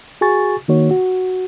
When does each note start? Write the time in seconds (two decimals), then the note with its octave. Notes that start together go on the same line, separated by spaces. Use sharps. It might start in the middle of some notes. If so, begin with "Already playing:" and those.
0.21 F#4 G#4 G#5 C#6 A6
0.68 D#3 A#3 D#4 F#4 C#5
0.91 F#4